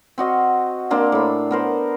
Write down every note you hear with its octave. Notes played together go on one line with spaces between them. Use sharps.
C4 F#4 D#5 F5
A#3 C4 D4 F5
A2 B5
B3 A#4 C5